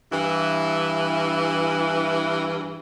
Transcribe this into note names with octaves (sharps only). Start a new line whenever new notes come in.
G2 E3